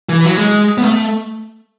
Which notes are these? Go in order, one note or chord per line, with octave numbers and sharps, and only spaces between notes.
E3
F#3
G#3
B3
A3